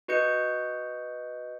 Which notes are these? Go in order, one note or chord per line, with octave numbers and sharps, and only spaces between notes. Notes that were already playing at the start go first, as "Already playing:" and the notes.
F#4 B4 D#5 G6 C#7